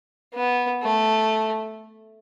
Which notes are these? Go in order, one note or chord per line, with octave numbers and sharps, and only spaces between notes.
B3
A3